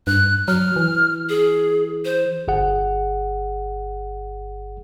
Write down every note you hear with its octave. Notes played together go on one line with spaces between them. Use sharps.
G2 F#6
F#3 F6
E3
G#4
C5
G1 G#4 F#5